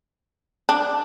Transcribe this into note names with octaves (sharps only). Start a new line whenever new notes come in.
D4